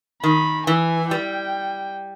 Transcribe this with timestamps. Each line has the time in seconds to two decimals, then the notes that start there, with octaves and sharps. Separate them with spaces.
0.23 D#3 B5
0.67 E3 G#5
1.11 G3 G5